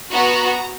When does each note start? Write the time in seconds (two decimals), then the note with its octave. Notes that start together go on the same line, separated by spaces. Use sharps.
0.13 B3 F#4 A#5